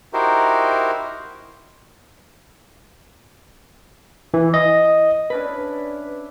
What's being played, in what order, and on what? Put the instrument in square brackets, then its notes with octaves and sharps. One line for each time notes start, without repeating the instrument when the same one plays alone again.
[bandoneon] D#4 E4 F#4 G4 A#4 C5
[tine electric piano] E3
D#5
[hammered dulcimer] C#4 D4 E4 [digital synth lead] B4